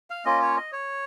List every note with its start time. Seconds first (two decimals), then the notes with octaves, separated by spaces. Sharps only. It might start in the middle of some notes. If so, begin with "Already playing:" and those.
0.10 F5
0.25 A#3 C#4 F4 D#5
0.42 C#5
0.57 D#5
0.73 C#5